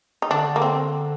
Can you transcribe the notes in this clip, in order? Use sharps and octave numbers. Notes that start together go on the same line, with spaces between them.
D#4
D3 D4
A#3
C4